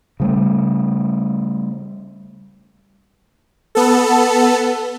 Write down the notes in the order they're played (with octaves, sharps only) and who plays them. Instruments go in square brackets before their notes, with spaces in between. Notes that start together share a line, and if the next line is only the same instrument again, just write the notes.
[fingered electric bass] C#3 G3 A3
[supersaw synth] B3 A4